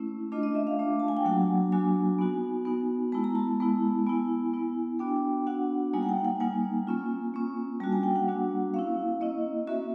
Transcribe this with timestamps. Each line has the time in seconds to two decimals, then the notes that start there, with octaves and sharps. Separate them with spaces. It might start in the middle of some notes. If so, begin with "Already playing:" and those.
Already playing: A3 C#4 E4
0.32 A3 D4 F4 D#5
0.43 D#5
0.55 E5
0.67 F5
0.79 A3 D4 F4
1.00 A5
1.08 G#5
1.17 G5
1.25 F#3 A#3 D4 F#4 F#5
1.72 F#3 A#3 D4 F#4 G#5
2.19 B3 D#4 F#4
2.65 B3 D#4 F#4
3.12 G#3 B3 E4 A5
3.24 A#5
3.35 A5
3.60 G#3 B3 E4
4.06 B3 E4 G#5
4.53 B3 E4
4.99 B3 D4 F#4 G5
5.47 B3 D4 F#4 F#5
5.93 G3 A#3 D#4 G#5
6.03 F#5
6.09 G5
6.25 F#5
6.40 G3 A#3 D#4 G#5
6.87 A#3 C#4 F4
7.34 A#3 C#4 F4
7.80 G3 A#3 D4 F#4 A5
7.92 G#5
8.03 G5
8.16 F#5
8.27 G3 A#3 D4 F#4
8.74 A#3 C#4 E4 F5
9.21 A#3 C#4 E4 D#5
9.67 A#3 C#4 F#4 E5